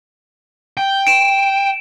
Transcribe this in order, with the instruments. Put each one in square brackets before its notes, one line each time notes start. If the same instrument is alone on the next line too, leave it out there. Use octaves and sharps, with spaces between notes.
[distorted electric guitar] G5
[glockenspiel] D7 E7